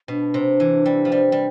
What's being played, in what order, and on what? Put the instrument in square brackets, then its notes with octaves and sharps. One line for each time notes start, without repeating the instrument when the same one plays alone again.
[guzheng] B2 [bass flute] D4
[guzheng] C3
E3
G3
F3
G3
G3